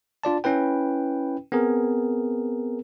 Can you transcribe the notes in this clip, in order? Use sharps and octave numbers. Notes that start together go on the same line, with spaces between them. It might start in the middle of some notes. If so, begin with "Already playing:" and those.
D4 F4 D5 A5
C#4 E4 B4 G5
B3 C4 G#4 A#4